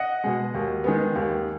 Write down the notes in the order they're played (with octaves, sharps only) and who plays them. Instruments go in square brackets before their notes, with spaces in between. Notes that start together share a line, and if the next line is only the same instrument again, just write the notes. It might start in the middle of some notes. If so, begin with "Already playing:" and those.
Already playing: [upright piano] D#5 F#5
B2 G#3
D#2
D#3 G#3 B3
D#2